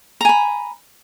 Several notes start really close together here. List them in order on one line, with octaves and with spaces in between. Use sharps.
A#5 G#5 B5